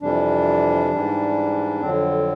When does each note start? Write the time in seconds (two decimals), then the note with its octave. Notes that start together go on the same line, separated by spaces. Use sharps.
0.01 F2 C3 E3 G3 D4
0.91 G#2 E3 G3
1.81 F2 D3 F#3 C4